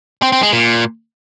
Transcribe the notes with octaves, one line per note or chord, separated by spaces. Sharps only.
C4
C4
G#3
A#2